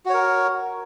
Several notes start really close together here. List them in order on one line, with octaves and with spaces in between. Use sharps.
F#4 C#5 A#4